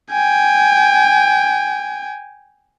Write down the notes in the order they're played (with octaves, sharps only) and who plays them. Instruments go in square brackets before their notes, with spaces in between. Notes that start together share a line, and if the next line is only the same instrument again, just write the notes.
[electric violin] G5 G#5